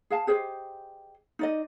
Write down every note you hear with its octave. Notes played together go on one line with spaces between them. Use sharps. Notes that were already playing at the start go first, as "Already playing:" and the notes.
G#4 F5 A5
G4 G#4 C5 D#5
D#4 D5 D#5